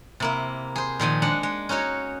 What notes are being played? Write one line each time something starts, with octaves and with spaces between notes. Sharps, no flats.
C3 A#3 E4
G#4 C5
A#2 D#3 F3 G#5
G#3 D4 F#5
G#3
C#4 D#4 F#4 C#5